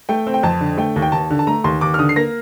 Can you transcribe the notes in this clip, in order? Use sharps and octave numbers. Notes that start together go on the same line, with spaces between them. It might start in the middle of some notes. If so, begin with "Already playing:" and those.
A3 G5
C4
G5
F2 A5
D3
A3 G5
D#2
G5
D#2 A5
D3
A5
A3 A#5
D#2 C6
D#2 D6
F6
D3 D#6
C7
A#3 A#6